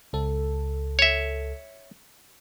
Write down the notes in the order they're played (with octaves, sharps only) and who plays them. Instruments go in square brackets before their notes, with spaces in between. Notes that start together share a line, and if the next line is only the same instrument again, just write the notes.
[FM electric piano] C#2 A4
[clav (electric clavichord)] C#5 E5